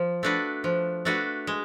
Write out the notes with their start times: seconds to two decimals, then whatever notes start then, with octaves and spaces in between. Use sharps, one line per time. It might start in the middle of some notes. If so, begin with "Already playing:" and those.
Already playing: F3
0.23 A3 D4 F#4 B4
0.64 F3
1.05 A3 D4 F#4 B4
1.47 G#3